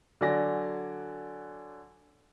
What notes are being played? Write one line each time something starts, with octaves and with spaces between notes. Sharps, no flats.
D3 F#3 D5 G#5 A#6